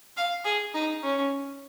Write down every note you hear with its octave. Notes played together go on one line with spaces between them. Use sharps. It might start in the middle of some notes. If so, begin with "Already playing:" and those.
F5
G#4
D#4
C#4